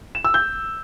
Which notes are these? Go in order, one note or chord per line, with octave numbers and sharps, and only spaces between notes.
E7
E6
G6